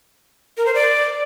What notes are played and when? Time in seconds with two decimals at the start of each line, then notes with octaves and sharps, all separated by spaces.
0.57 A#4
0.66 C5
0.75 D5